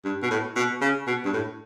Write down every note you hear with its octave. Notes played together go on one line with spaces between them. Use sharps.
G2
B2
A2
B2
C#3
B2
G2
A2